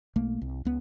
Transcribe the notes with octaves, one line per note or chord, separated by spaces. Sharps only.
B1 A3 A#3
C2
C#2 B3